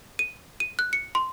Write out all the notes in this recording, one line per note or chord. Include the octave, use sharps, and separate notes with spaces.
D#7
D#7
F#6
C#7
C6